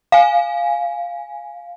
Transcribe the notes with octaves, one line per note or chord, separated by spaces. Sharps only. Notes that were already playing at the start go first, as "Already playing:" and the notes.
F5 G#5